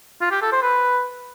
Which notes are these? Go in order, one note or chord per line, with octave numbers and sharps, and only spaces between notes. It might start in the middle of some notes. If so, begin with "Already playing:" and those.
F4
G4
A4
C5
B4